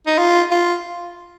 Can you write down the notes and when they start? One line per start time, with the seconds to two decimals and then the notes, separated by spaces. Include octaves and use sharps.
0.07 D#4
0.18 F4
0.51 F4